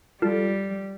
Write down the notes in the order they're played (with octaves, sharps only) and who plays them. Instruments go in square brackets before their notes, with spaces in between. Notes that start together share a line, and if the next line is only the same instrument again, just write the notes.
[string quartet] G3 [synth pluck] F4 A4